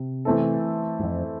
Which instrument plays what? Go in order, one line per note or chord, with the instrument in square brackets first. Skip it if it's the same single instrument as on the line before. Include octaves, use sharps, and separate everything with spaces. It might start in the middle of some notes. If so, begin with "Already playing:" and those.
Already playing: [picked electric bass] C3
[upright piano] E3 A3 C4 E4 A4
[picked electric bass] G#2
F2